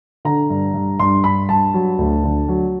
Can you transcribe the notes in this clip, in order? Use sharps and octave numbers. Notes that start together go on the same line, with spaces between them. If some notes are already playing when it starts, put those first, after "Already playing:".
D3 A#5
G2
G2
G2 C6
G2 B5
G2 A5
F#3
D2
D3
F#3